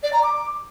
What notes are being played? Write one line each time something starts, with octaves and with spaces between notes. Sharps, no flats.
D5
A#5
D6